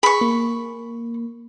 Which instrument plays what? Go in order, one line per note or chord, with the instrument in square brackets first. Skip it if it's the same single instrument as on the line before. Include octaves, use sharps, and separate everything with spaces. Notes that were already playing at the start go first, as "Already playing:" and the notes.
[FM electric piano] G#4 [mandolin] B5 C#6
[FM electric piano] A#3